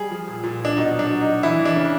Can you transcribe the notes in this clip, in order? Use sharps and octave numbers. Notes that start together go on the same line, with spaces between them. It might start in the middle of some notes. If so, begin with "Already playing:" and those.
Already playing: G3 G#4
F3
A#2
A#2
A#2 D4
B2 D#4
F#3
D4
F#3
D#4
F#3
E3 E4
E3
D4
C#3